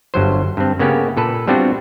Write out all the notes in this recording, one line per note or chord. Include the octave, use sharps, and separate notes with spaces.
G1 G2 F#3 C5
G2 C4
C#3 A#3 B3 C#4 G4
A#2 A4 B4
G3 B3 C4 D4 F4 F#4